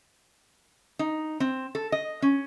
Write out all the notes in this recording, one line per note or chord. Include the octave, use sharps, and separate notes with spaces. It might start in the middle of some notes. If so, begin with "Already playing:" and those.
D#4
C4
A4
D#5
C#4